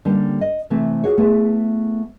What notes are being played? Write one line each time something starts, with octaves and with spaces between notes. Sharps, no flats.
D3 G3 A#3 C#4 D4 G4
D#5
C3 E3 A3 C4
F4 F#4 G#4 C#5
A3 B3 E4 G#4